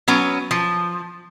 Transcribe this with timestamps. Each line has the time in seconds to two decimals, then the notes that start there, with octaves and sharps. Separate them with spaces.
0.08 F#3 B3 C#4
0.51 F3